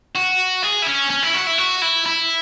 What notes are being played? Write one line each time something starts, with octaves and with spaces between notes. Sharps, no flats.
F#4
G#4
E4
C#4
C#4
E4
F#4
E4
F#4
E4
E4